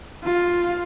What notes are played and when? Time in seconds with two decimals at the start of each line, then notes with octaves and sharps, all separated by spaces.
0.24 F4